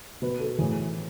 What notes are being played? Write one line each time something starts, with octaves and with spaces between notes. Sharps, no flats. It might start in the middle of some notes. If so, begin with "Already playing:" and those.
B2 B4
A4
A2 E3 G#4